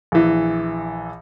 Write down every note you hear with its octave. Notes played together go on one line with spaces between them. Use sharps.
A#1 E3